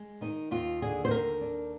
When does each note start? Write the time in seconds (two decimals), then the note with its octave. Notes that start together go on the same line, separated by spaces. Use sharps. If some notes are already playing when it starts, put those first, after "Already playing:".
Already playing: G#3
0.21 D#3 D#4
0.51 D#2 F4
0.82 D3 G#4
1.05 C5
1.11 D#2 A#4
1.41 D4